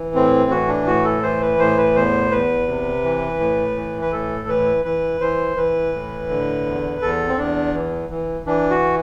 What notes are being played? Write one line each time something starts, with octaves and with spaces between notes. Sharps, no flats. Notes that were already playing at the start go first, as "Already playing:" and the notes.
Already playing: E3
A2 C4
E3 F#4
D4
A2 F#4
A4
E3 C5
B4
A2 C5
B4
E2 C5
E2 B4
C3
E3
A2
E3
B4
A2 A4
E3 B4
E3 B4
E3 C5
E3 B4
A2
D3
E2
E2 A4
C4
E2 D4
E3
E3
E3 D4
F#4